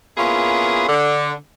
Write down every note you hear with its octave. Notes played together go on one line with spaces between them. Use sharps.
A#3 B3 C#4 E4 F4 G#4
D3